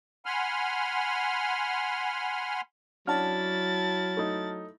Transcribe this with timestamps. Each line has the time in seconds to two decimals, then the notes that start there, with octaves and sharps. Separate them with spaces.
0.26 F#5 G#5 B5 C6 F6
3.07 F#3 C#4 D4 E4 F#4 A5 F6 A6
4.17 A3 D#4